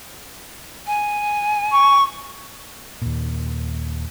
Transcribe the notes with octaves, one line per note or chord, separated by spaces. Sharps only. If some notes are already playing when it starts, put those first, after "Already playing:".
G#5
C#6
D#2 A#2